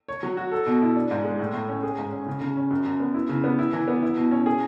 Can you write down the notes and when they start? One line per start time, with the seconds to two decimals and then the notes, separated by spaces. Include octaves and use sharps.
0.08 C#5
0.23 F#3
0.37 F#4
0.52 A4
0.66 B2
0.82 E4
0.96 D4
1.11 G#2
1.24 G#3
1.39 A2
1.54 A2
1.69 C#4
1.83 G#4
1.98 G#2
2.12 C#4
2.26 C#3
2.41 C#3
2.57 C#4
2.71 F#2
2.86 F#2
3.00 B3
3.14 E4
3.29 C#3
3.44 B3
3.59 E4
3.73 E3
3.88 B3
4.02 E4
4.17 B2
4.31 C#4
4.46 G#4